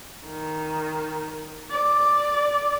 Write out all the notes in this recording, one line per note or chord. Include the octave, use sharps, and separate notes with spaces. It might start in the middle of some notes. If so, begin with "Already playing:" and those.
D#3
D5